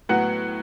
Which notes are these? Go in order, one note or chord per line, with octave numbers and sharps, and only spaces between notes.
A2 F#3 B3 F#5